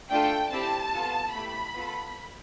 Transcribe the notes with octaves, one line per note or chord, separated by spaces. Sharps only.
A3 D4 F4 A4 G5
C4 E4 G4 A5
B3 F4 A4
A3 E4 G4 B5
B3 F4 A4